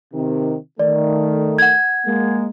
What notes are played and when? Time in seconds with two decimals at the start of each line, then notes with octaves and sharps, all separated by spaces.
0.14 C3 D#3
0.79 D#3 A3 D5
1.58 F#5 G#6
2.05 G#3 A#3